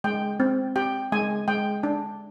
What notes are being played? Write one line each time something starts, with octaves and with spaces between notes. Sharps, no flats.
G#3 G5
C4
G4 G5
G#3 G#5
G#3 G5
D4